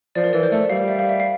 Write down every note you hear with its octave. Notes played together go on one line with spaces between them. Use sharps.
F3 D5
A#4
E3 D5
C5
A3 D5
G3 F5
E5
F5
E5
F5